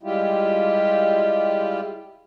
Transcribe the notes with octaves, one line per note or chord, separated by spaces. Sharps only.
G3 G#3 E4 F4 G4